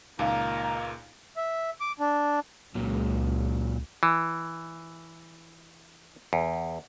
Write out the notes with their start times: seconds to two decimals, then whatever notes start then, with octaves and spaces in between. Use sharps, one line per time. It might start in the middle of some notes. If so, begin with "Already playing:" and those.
0.19 C#2 A#2 D#3 A#3 D#4 D5 F5 A#5
1.36 E5
1.80 D6
1.99 D4
2.75 C#2 A#2 F#3
4.03 E3
6.33 E2